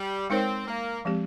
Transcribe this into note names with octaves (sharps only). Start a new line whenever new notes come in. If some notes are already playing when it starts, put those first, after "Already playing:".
Already playing: G3
G#3 C4 D#4 A#4 C#5
A#3
F3 G#3 C4 G4